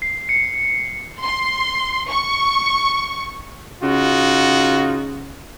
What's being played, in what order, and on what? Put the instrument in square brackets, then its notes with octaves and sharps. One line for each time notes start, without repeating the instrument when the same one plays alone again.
[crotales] C7
C#7
[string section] C6
C#6
[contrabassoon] C#3 [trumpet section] D#4 F4 F#4